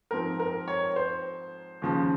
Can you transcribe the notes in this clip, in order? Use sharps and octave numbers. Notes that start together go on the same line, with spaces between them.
G#2 F3 C4 A#4
A#4
C#5
C5
D#2 C#3 F3